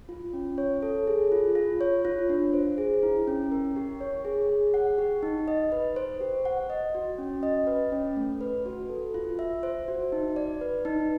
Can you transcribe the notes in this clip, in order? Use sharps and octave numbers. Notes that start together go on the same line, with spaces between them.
F4
C#4
C#5
A4
G#4
F4
F4
C#5
F4
D4
C5
G#4
E4
C#4
A#4
G4
C#5
G#4
G#4
F#5
G4
D#4
D#5
B4
C5
G4
F#5
D#5
F#4
C#4
D#5
B4
C#4
A3
B4
F#4
A4
F4
E5
C5
F#4
D#4
D5
B4
D#4